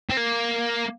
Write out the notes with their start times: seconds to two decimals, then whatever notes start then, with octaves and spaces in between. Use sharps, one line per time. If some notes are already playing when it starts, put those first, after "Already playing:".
0.10 C4
0.17 A#3